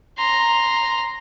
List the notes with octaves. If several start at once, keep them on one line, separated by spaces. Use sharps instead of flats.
A#5 C6